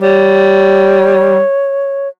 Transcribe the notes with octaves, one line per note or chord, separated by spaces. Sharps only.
G3 C#5